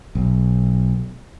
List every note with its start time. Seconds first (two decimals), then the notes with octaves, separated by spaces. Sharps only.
0.15 B1